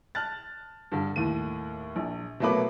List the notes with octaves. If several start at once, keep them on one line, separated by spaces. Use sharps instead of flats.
A5 F6 F#6 A6
G2 D3
D#2 A2 D#7
A#1
B2 F#3 A3 A#3 B4 D6